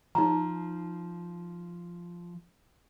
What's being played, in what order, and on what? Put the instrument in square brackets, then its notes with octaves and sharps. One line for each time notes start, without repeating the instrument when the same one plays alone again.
[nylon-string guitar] F3 [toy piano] D#4 A#5